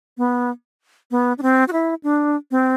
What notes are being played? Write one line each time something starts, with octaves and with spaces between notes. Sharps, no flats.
B3
B3
D4
C4
F#4
E4
D4
C4